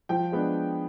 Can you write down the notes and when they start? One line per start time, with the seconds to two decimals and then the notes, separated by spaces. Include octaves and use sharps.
0.09 F3 G5
0.32 G#3 B3 D4